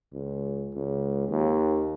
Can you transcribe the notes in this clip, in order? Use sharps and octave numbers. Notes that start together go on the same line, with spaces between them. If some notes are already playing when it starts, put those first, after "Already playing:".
C#2
C#2
D#2